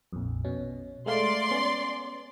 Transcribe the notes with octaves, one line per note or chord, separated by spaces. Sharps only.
A#1 F2
B2 C#4
G#3 A3 D5 F5 C6
B3 C#4